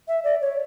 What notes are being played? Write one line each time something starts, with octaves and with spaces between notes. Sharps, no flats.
E5
D5
C#5